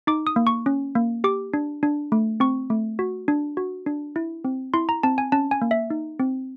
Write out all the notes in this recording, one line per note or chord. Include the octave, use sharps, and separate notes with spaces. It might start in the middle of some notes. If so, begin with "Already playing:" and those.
D#4 D6
D#6
A#3
C#6
C#4
A#3
G4 D6
D4
D4
A3
C4 C#6
A3
F#4
D4
F#4
D4
E4
C4
E4 C6
A#5
C4 A5
G#5
C#4 A5
G#5
A#3
E5
D#4
C4